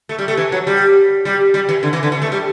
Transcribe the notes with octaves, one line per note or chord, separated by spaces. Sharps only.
A3
G3
A3
E3
F#3
G3
G3
G3
E3
D3
E3
D3
E3
A3
G3